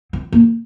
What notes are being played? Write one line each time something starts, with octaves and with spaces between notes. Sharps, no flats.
C4
A#3